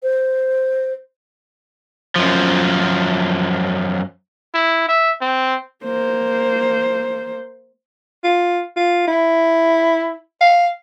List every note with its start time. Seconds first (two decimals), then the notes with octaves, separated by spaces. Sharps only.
0.03 C5
2.16 F#2 F3
4.54 E4
4.88 E5
5.21 C4
5.84 A#3 C5
8.24 F4
8.76 F4
9.07 E4
10.41 F5